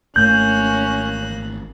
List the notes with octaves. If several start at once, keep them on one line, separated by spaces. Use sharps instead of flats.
G#1 A3 A#3 C#4 F#6 G6